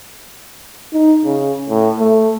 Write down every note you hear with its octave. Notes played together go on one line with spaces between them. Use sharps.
D#4
C#3
A2
A3